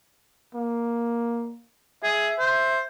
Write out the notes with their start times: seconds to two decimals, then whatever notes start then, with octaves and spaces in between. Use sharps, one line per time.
0.55 A#3
2.04 G#4 E5
2.39 C5